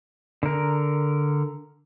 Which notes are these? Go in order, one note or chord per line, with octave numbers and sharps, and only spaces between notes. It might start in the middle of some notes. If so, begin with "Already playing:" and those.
D3 A#4